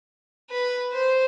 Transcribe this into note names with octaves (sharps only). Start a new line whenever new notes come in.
B4
C5